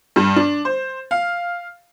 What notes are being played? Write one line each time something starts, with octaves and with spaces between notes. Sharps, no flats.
G2
D4
C5
F5